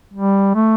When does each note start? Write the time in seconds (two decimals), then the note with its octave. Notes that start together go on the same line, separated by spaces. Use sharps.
0.14 G3
0.55 A3